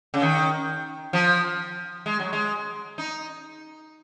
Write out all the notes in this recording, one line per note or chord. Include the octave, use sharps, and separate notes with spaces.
C#3
D#3
F3
G#3
F#3
G#3
D#4